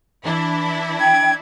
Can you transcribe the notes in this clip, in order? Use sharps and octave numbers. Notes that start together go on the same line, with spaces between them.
E3 D4 E4
G5 G#6